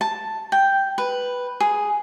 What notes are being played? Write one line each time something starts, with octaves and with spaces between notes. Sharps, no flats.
A5
G5
B4
G#4